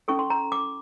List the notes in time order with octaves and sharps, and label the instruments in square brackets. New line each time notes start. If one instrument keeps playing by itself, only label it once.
[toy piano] C#4 E4 A4 C#6
C6
A#5
D6